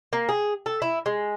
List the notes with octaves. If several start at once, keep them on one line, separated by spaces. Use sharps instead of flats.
A#3
G#4
A4
E4
G#3